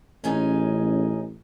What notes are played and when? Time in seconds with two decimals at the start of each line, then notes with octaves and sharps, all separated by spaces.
0.24 A1 C#4 D#4 G#4